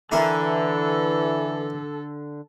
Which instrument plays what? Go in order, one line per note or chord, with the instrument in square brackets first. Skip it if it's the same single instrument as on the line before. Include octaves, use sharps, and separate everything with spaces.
[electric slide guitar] D3 [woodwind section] E3 [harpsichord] D4 E4 A#4 [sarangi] A4